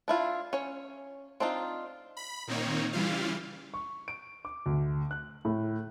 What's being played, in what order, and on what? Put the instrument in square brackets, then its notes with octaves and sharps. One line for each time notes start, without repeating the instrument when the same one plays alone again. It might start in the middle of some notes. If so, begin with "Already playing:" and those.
[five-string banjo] D4 E4 F4
C#4 C#5
C4 D4 D#4 F4
[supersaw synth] B5
A#2 D#3 A#3 C4 D#4 C#5
C#3 E3 G3 E4 F4 F5
[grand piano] C#6
D7
D6
D2
F#6
A2